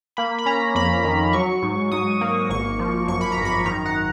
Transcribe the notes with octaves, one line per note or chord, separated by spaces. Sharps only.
A#3 B5
B5
C#4 A#5
F2 B5
D#3
F#3 C#6
G#2
G#2 D#6
A#3
G#1 C#6
F3
F#2 C#6
B5
A#5
G#1
B5
D#3 A#5
F#5